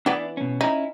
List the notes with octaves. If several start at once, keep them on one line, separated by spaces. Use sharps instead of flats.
E3 B3 D4 E4 D5
B2 C#4
C#4 D#4 E4